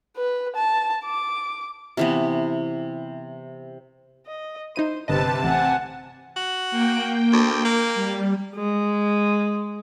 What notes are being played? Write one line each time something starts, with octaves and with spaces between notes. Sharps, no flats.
B4
A5
D6
C3 E3 B3
D#5
D#4 E4 C5 D#7
G1 C3 B4 D#5 A5
A1 F#5 G#5
F#4
A#3 G5
D2
A#3
G3
G#3